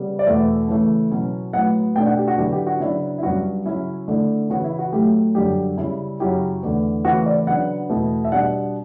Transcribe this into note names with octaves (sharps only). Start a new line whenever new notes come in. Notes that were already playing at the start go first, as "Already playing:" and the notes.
Already playing: C#3 G3 B3
D5
E2 B2 A3 E5
C#3 E3 A3
B2 F#3 C#4 E4
A2 F#3 B3 F#5
B2 A3 D4 G5
F#5
G4
F#4
D3 F#3 B3 E4 G4
G4
F#4
C#3 F#3 B3 D4 E4
E4
G2 F#3 C#4 F#4
C#3 F#3 C#4 E4
D3 A3 E4
C#3 E3 B3 F#4
E4
F#4
A2 F#3 A3 G4
F#2 D3 G3 G4
C#3 G3 C#4 E4
F#2 C#3 F#3 C#4 E4 G4
E2 D3 A3
C#3 E3 A3 E4 F#4
D5
C#3 F#3 B3 D4 F#5
E2 B2 A3 E4
E5
B2 G3 D4 F#5